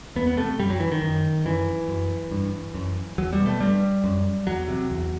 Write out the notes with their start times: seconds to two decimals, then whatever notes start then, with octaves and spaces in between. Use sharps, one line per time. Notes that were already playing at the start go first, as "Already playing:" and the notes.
0.16 E2 B3
0.27 B3
0.37 C3 A3
0.59 F#2 G3
0.70 F#3
0.80 E3
0.92 D#3
1.02 F#2
1.45 F#2 E3
1.88 F#2
2.31 G2
2.74 F#2
3.18 E2 F#3
3.33 G3
3.40 B2
3.46 A3
3.60 G2 G3
4.04 F#2
4.47 E2 F#3
4.68 C3
4.91 E2